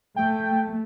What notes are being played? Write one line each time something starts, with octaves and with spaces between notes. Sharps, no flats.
A3 G5